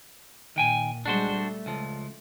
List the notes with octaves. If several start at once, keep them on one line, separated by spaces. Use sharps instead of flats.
A#2 D#3 G5 G#5
G3 G#3 D4 F#4 C5
A3
C#2 F3